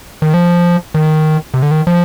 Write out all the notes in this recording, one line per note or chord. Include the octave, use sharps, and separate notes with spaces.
D#3
F3
D#3
C3
D3
D#3
F3